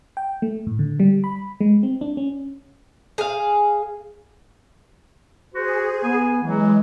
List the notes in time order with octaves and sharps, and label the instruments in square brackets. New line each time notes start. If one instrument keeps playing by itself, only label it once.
[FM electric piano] G5
A3
A2
D3
G3
B5
G#3
C4
D4
C#4
[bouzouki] G#4 F5
[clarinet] F#4 [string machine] G#4 [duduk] C5
[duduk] B3 [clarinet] G#5
[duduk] E3 [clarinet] F#3 [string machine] G#3